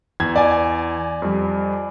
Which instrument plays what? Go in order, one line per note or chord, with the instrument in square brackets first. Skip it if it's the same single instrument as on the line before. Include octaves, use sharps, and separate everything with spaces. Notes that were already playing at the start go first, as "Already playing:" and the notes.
[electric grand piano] E2 [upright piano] G#6
[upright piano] D5 G#5
[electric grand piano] F2 G3